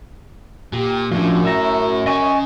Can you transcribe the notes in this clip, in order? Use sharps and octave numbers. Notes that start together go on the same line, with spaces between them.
A#2 G4
F#2 A2 F3 D4
E5 A#5
C#3 D#5 G#5 C#6